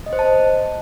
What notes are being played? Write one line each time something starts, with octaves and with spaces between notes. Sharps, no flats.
D#5
C5
A5
D#5